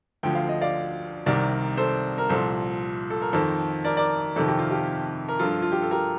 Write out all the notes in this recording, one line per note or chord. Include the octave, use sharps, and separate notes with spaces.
D2 D3 F3 G5
F5
D#5
D5 F5
C2 C3 D#3 A#4 D5
A4 C5
A#4
C2 A#2 F3 A4 C5
A4
A#4
F2 D#3 A4 C5
A#4 D5
A#4 D5
F2 C3 D#3 A4
G4
F4
G4
A#4
G2 F3 F4 A4
F4
G4
A4
G4 A#4